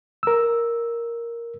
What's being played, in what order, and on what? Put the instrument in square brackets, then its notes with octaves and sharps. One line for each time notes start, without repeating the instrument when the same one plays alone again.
[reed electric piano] A#4 E6